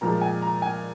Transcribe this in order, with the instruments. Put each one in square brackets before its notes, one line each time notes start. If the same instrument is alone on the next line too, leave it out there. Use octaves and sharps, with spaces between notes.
[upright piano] A#2 F3 G#3 A#5
G#5
A#5
G#5